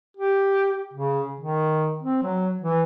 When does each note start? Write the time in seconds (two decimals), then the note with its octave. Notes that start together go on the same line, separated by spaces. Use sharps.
0.17 G4
0.94 C#3
1.40 D#3
2.03 C4
2.23 F#3
2.62 E3